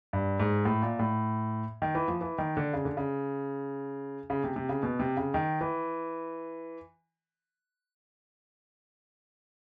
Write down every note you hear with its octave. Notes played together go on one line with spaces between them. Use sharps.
G2
G#2
A2
A#2
A2
D#3
E3
F3
E3
D#3
D3
C#3
D3
C#3
C#3
C3
C3
C#3
B2
C3
C#3
D#3
E3